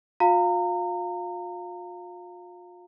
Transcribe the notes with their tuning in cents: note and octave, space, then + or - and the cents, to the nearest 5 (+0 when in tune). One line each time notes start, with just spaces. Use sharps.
F4 +40 F5 +0 A#5 -30